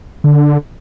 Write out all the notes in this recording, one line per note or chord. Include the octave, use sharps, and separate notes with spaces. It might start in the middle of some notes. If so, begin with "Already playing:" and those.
D3